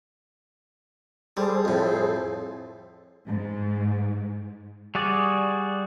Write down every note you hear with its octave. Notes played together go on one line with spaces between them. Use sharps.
G3 G#4 A4 C5
F2 A2
G#2
G3 F#4 G#4 D5